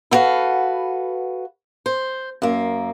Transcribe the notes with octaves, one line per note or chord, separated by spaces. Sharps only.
E4 F#4 A4 B4 F5
C5
F#2 A#3